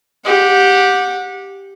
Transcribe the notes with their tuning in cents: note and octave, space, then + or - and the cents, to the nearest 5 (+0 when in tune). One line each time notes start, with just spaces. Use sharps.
G4 +0 F#5 -25